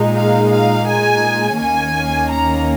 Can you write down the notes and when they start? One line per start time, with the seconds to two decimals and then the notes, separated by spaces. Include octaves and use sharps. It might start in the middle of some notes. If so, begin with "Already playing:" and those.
Already playing: A#2 G#3 D#4
0.17 F5
0.53 F5
0.88 G#5
1.60 D#2 D#3 A#3 C#4 G#5
2.31 A#5